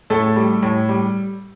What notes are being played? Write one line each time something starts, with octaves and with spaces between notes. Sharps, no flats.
A2 A3 A4
G3
A2
G3